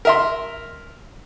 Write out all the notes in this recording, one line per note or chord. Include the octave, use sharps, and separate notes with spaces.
A#4 E5 C6